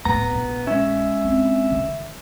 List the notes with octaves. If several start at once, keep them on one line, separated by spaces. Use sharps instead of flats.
D1 A2 B3 A#5
A#1
G#3 C#4 E5
C4
D#3